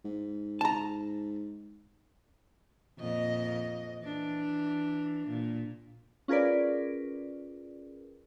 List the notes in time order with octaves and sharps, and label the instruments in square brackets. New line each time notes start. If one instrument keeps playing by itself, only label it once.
[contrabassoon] G#2
[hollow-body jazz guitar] A5 A#5
[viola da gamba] F2 A#2 D#5
E3 D4
A#2
[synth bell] C#4 F4 G#4 A#4 B4 D5